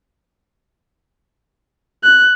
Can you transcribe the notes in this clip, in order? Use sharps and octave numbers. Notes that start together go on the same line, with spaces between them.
F#6